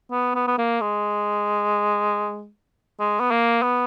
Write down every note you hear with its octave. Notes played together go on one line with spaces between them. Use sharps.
B3
B3
B3
A#3
G#3
G#3
B3
A#3
B3